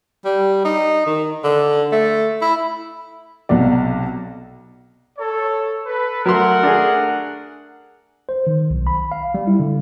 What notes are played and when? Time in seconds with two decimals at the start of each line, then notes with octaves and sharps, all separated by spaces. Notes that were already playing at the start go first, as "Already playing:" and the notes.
0.25 G3
0.64 D#4
1.06 D#3
1.44 D3
1.92 A3
2.42 E4
3.49 B1 C3 F#3 D5
5.18 A4 C#5
5.86 A4 B4
6.26 F#3 A3 A#4 F#5 C6
6.63 D4 G#4
8.29 C5
8.47 D#3
8.70 B1
8.87 B5
9.12 F5
9.34 G3
9.47 E4
9.60 D3